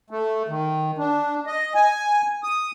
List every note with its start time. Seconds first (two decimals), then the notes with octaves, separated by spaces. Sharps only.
0.10 A3
0.49 D#3
0.98 D4
1.47 D#5
1.75 G#5
2.43 D#6